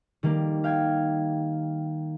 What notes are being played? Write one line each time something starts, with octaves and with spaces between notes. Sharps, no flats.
D#3 G3 A#3
F5 G5 G#6